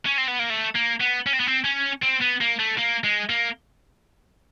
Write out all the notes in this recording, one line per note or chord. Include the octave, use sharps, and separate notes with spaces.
C#4
C4
B3
A#3
A3
A#3
B3
C#4
C4
B3
C4
C#4
C4
B3
A#3
A3
A#3
G#3
A#3